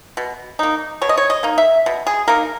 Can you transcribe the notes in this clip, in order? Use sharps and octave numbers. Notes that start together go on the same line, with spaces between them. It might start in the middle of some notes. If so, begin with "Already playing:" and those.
B2
A#3 D#4
B2 C#5
D#5
C#5
D#5
A#3 D#4
E5
B2
G#4
A#3 D#4 A#4